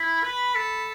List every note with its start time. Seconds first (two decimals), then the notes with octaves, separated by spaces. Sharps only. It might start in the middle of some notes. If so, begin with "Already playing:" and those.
Already playing: E4 B5
0.23 B4
0.54 A4 B5